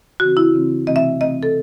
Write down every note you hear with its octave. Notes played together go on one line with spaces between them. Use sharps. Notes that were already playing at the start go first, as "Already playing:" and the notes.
C#3 E3 C4 F#4
E4
C#3 E3 C4
C3 E3 A3 C4 D#5
E5
C3 E3 A3 C4 D#5
A4